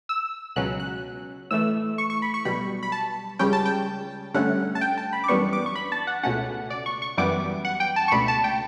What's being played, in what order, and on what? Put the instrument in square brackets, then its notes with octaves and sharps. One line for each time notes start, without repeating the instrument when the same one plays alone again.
[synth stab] E6
C#2 B2 F#3 C#4 F#6
F#6
A2 E3 A3 E6
C#6
C#6
B5
C#6
B1 B2 G3 B5
B5
A5
C#2 C#3 G3 C#4 G5
A5
G5
G2 D3 A3 C#4 F#5
A5
G5
A5
B5
D6
F#2 E3 G3 B3 D4 C#6
D6
C#6
B5
A5
F#5
C#2 B2 A3 C#4 F#5
D5
C#6
C#6
F#2 E3 G3 B3 D6
F#5
G5
A5
C#6
C#2 B2 A3 D4 B5
A5
G5